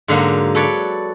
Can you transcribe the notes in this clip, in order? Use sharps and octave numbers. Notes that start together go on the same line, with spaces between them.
G#2 D3 F#3 A#3
A4 B4 C#5 D5